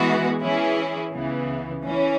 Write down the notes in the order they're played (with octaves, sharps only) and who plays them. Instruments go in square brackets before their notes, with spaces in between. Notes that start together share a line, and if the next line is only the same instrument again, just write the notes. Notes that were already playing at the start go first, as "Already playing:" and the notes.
Already playing: [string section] E3 G#3 B3 F#4
E3 C#4 E4 G#4
C#2 C#3 E3 B3
E3 C#4